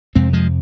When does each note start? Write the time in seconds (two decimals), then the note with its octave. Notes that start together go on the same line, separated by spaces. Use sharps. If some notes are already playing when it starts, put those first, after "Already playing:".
0.15 F2 C3 G#3 C4
0.33 F3 G#3